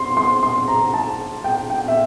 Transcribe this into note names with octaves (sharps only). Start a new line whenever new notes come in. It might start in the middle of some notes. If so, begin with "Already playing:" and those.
Already playing: C6
C6
C6
A#5
A5
G5
G5
E5